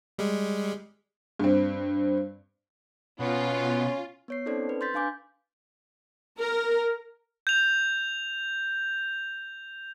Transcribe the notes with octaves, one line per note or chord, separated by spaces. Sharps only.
G3 G#3
G2 C4
B2 B3 C#4 F4
B3 C#5 C7
C4 C#4 D#4 A4 C5 D5
B4
C6 G6 A6 B6
D4 F5 G#5 D6 G6
A#4
G6 F7